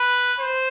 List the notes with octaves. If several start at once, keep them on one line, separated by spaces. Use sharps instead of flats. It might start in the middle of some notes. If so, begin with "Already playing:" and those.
Already playing: B4
C5